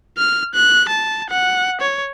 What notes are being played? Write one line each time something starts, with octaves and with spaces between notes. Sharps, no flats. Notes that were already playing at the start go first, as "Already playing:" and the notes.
F6
F#6
A5
F#5
C#5